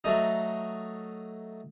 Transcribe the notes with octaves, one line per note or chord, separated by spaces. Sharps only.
F#3 A3 D#4